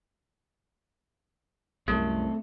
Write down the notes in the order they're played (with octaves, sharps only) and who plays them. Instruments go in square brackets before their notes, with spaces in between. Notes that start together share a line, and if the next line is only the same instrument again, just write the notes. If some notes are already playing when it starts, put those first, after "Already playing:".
[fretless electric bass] C2 F#2 [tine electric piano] A3 [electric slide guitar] C4 A4